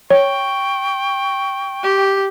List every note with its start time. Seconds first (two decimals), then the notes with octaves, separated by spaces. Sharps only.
0.10 C#5 G5 C#6
1.83 G4